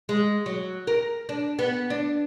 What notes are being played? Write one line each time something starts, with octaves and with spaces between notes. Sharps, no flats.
G#3
F#3
A#4
D4
B3
D4